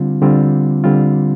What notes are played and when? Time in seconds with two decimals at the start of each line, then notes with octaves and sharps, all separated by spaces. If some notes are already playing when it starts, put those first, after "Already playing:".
Already playing: D3 G3 C4 F4
0.22 D3 G3 C4 F4
0.84 D3 G3 C4 F4